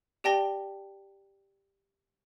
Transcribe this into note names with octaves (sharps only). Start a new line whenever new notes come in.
G4 D5 G5 A5 A#6 G7